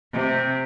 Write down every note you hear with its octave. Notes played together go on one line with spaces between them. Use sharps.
C3